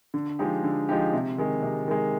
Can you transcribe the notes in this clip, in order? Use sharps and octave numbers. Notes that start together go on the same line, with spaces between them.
D3
F3 G#3 D#4 G4
D3
F3 G#3 D#4 G4
C3
D#3 G#3
C3
D#3 G#3